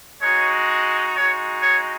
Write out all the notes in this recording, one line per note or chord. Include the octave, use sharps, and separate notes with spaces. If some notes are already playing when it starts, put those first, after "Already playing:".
G#3 D#4 F#4 C#5
G#3 D#4 F#4 C#5
C#5